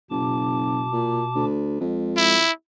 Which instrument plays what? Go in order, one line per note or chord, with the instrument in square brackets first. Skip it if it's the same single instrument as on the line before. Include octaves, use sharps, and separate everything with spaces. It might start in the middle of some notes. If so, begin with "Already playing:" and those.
[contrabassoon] F#1 [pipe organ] B2 A5 D6
[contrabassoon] A#2
D2
[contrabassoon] F2 [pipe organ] G#3
[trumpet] E4